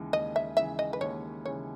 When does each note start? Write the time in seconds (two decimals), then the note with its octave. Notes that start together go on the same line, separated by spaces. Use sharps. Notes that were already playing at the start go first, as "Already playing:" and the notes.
Already playing: D#2 C#3 E3 G#3
0.13 D#2 D#5
0.36 E5
0.57 C#3 E3 G#3 E5
0.79 D#5
0.93 B4
1.01 D#2 C#5
1.45 C#3 E3 G#3 C#5